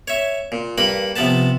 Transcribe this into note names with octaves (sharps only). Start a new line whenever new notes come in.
C#5 E5
A#2
G2 A#3 B4 B5
C3 F3 B3 B4 A5